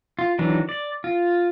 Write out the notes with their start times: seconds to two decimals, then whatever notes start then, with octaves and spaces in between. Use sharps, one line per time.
0.19 F4
0.39 D#3 E3 F#3 D4
0.69 D5
1.04 F4